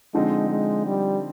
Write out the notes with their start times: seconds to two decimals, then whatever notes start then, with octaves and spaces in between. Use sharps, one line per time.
0.14 D3 F3 G#3 C4 D#4
0.50 G#3
0.86 G3